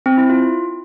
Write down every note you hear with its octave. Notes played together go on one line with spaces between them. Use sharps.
C4
E4
F4